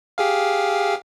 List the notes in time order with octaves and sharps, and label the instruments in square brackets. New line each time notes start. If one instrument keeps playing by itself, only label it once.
[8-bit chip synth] G4 G#4 F5